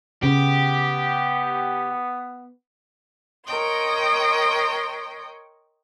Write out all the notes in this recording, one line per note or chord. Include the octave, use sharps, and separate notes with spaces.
C#3 B3 G4
A#4 C#5 D#5 G5 C6